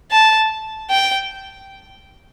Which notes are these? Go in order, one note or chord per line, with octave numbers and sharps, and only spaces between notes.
A5
G5